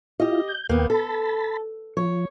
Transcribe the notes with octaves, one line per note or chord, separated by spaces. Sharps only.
E4 F4 G4 D#5
G6
D#2 A#3 B3 G5
A4 A5 B5
F3 C#5